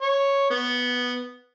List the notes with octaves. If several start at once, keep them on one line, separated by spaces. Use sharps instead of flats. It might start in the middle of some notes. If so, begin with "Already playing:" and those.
C#5
B3